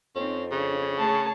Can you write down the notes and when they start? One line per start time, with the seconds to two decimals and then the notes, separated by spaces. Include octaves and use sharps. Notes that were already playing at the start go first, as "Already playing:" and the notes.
0.15 F2 C4 C#4 D#4
0.51 C#3 D4 C#5
0.98 A3 G#4 C#5 A5